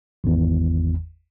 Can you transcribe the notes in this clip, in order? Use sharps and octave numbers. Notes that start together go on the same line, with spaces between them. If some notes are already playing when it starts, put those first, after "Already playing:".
G#1 E2